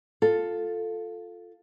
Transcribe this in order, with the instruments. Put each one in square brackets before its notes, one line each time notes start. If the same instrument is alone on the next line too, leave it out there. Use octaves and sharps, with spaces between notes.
[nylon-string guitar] F4 A4